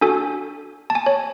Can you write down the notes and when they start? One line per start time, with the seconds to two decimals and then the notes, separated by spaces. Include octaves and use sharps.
0.01 D4 F#4 A4 G#5
0.90 A5
0.95 G#5
1.06 C#5